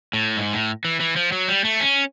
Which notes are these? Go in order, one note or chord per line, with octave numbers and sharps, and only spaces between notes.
A2
G#2
A2
E3
E3
F3
F#3
G3
A3
C#4